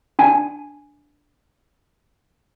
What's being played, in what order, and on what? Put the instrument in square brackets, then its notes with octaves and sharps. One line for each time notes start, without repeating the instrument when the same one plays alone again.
[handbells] D4 G#5